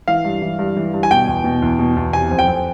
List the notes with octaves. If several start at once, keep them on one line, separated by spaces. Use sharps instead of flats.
E3 F5
G2
E3
G2
E3
G2
G#5
B2 G5
E2
B2
E2
B2
E2
C3 G#5
F2
G5
F2